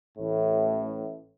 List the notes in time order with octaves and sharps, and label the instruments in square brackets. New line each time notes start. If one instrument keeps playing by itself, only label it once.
[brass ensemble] A1 A2